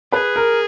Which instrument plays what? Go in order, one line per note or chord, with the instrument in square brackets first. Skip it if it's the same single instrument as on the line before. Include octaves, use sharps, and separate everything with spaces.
[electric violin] G#4 [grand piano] B4
[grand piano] A#4